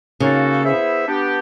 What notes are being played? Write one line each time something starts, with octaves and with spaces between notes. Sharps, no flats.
C#3 A#3 D#4 F#4 A4
B3 E4 G#4 C5 E5
B3 D4 G4